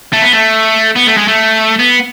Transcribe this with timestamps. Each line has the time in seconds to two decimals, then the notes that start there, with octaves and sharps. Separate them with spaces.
0.13 A3
0.22 B3
0.32 A3
0.96 B3
1.07 A3
1.17 G#3
1.28 A3
1.79 B3